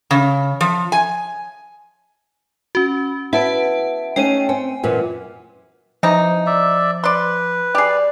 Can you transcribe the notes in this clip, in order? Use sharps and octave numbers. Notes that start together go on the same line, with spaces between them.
C#3
F3
G#5
C#4 F#4
B3 E4 F#5 A5 D7
A3 C#4 D#4 G5 D#7
C4 G#5
F#2 A#2 E3
C3 E3 F3 D#4
D5 E5
B4 D5 C6
G4 G#4 D5